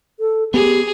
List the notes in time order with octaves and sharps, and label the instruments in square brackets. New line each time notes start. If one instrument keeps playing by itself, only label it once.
[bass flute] A4
[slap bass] B3 [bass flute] G4 [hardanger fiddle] G#4